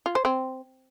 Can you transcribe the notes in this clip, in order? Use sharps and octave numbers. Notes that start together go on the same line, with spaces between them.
F4
C5
C4